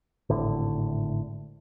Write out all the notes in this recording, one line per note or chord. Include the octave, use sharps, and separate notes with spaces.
G#1 A2 D3